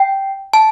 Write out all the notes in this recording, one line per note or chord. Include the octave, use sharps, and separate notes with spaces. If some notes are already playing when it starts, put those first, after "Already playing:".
Already playing: G5
A5